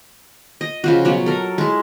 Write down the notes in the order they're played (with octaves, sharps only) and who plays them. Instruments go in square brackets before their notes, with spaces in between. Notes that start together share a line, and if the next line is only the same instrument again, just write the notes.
[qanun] D#5
C#3 F3 F#4
B2 F#3 F#4 C#5
A4 A#4
G#3 E4